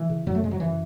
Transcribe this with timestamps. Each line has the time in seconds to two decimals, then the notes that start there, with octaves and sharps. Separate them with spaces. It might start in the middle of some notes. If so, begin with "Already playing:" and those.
Already playing: E3
0.09 C#3
0.26 F#2 F#3
0.35 A3
0.43 C#3 G#3
0.51 F#3
0.59 F#2 E3